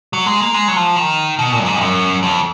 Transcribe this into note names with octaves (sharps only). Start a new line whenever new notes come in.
F#3
G#3
A#3
G#3
F#3
F3
D#3
B2
A#2
F#2
G#2
F2
F#2
F2